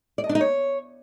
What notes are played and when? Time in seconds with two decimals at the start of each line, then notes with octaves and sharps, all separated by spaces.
0.18 D5
0.24 D#5
0.29 D4
0.35 D#4
0.41 C#5